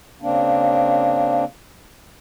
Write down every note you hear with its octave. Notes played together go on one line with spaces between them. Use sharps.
C#3 A#3 C4 D4